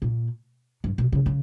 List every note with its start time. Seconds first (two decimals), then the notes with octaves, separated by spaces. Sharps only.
0.02 A#2
0.84 G2
0.98 B2
1.12 C#3
1.26 C#3